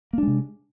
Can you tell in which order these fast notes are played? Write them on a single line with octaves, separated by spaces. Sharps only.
A#3 D4 G#3 C3